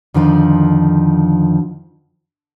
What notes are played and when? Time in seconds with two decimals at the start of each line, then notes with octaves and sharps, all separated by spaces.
0.14 F2 D3 D#3 F3